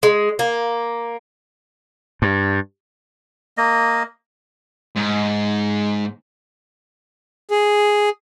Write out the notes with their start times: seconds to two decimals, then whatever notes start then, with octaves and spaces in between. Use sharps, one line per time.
0.03 G#3
0.39 A#3
2.22 G2
3.58 A#3 D#5
4.96 G#2
7.51 G#4